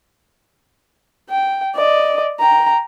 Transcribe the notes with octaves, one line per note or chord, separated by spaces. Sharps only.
G5
D5 D#5
G5 A#5